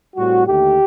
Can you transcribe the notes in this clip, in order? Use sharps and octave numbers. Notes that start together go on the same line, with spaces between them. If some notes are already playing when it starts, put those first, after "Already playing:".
A2 G3 C4 F#4
D#2 D3 A3 G4